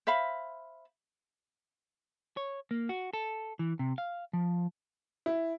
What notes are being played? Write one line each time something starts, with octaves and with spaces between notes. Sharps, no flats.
C5 E5 F5 B5
C#5
A#3
F#4
A4
E3
C3
F5
F3
E4